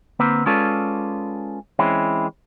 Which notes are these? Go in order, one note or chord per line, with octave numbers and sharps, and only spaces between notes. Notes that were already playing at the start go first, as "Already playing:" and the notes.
D3 A#3 C4 B4
G#3 C#4 F4 A4 B4 D5
E3 G#3 C4 C#4 E4